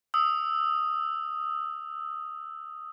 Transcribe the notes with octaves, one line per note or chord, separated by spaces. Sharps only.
D#6 E6